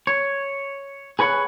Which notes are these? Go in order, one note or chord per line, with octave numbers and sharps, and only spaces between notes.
C#5
G#4 B4 C#5 F#5